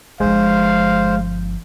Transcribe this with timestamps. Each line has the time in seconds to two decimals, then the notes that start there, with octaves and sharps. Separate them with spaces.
0.20 G1 F3 G#3 C5 F5